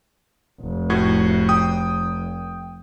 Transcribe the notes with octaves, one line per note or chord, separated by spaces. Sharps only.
F1
A2 F#4 G#6
G5 D#6